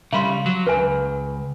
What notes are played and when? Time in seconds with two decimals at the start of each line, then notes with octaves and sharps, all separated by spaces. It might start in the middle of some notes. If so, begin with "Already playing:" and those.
0.13 C#3 G3 F5 B5 C6
0.46 F#3
0.67 C#2 B4 G#5